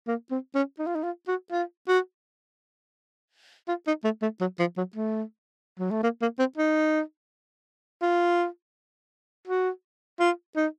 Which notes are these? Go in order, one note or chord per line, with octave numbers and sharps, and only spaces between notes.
A#3
C4
C#4
D#4
F4
D#4
F4
F#4
F4
F#4
F4
D#4
A3
A3
F#3
F3
F#3
A3
F#3
A3
A#3
A#3
C4
D#4
F4
F#4
F4
D#4